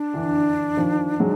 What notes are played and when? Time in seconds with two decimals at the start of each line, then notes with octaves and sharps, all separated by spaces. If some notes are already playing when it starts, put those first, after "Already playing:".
Already playing: D4
0.14 D3 E3
0.77 D#3 F3
1.20 F#3 G#3